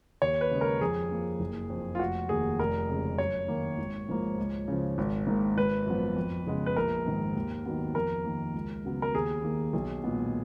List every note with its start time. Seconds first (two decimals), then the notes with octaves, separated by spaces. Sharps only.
0.22 D#2 C#5
0.41 B4
0.51 C#3 G#3
0.61 A#4
0.81 F2 G#4
1.10 F3 A#3
1.40 F#1
1.70 F2 F3
1.95 F4
1.99 F1 F#4
2.29 D#2 D#3 A#3 G#4
2.59 F1 A#4
2.89 F2 C#3 G#3
3.18 F#2 C#5
3.48 D#3 A#3
3.78 G#1
4.09 G#2 F3 A#3
4.38 C#2
4.68 C#3 F3
4.98 G#1
5.27 G#2 D#3 A#3
5.56 G#1 B4
5.86 F#2 F3 B3
6.16 F2
6.46 C#3 G#3 B3
6.66 B4
6.77 A#1 A#4
7.06 G#2 D#3
7.36 D#2
7.65 D#3 F#3 B3
7.95 F2 A#4
8.24 D#3 A#3
8.54 C#2
8.85 C#3 F#3 B3
9.02 A#4
9.14 D#2 G#4
9.43 D#3 A#3
9.73 B1
10.04 A#2 G#3 B3